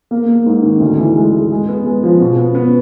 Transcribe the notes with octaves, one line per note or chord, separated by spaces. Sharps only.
A#3
A#3
G#2
D#3
D2
E3
G#3
G#3
G#3
B3
G#3
F3
B2
B3
B3